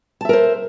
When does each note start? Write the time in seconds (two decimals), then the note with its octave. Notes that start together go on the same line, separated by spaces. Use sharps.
0.21 A5
0.25 E5
0.29 A#4
0.33 C5